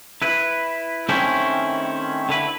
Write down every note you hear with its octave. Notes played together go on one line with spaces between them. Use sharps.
E4 B4
D#3 A3 C4 C#4 E4 G4
D3 E4 B4